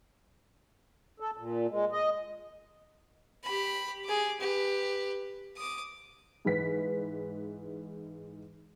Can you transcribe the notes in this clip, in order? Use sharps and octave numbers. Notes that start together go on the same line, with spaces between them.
A4
A#2
G#3
D#5
G4 B5
G#4 D6
G4 B4
D6 D#6
G#2 E3 B4 B6